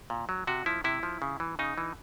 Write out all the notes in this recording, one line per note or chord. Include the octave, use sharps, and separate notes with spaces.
A#2
F#3
C3 F#4
F3 E4
C3 E4
F3
C#3
E3
C#3 D#4
E3